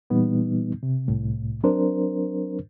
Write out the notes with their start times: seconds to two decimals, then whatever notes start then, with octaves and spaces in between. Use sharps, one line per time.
0.10 A#2 E3 G3 B3 D#4
0.83 C3
1.08 C2 A2
1.63 F#3 C4 D4 A#4 C5